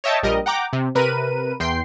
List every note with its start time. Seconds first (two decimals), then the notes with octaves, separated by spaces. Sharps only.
0.04 C#5 D#5 E5 G5 A5
0.23 A#1 G3 A#4 D#5
0.46 F#5 G5 A#5 D6
0.73 C3
0.95 C3 A#4 B4 D#7
1.60 E2 G5 C6 C7